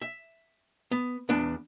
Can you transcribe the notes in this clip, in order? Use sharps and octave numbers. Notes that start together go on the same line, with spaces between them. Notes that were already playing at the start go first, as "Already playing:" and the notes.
E5
B3
E2 B3 D4